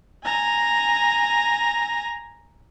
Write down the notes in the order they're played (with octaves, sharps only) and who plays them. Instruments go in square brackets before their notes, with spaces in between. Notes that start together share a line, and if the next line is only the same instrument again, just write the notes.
[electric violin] G#5 A#5